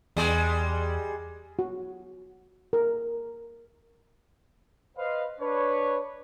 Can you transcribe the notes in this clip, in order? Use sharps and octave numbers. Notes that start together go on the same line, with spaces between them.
E2 G3 G#3
F#4
A#4
B4 C5 D#5 F5
D4 B4 C#5